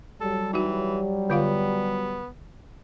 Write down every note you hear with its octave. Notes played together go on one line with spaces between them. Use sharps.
F#3 G3 A4
E3 D#4 F#4
D3 B3 F4 F5